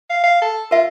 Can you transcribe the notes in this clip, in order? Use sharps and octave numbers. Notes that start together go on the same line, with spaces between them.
F5
F5
A4
F4 A#4 E5